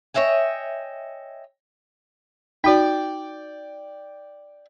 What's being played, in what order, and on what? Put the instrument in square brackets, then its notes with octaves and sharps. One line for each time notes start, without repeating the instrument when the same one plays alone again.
[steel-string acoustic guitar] C#5 D#5 E5 G5 G#5
[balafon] D#4 F#4 [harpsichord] D5 G5